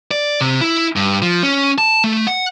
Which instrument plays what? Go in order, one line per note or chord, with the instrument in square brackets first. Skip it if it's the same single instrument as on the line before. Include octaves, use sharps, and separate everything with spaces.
[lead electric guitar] D5
C3
E4
G2
F3
C#4
A5
A3
F#5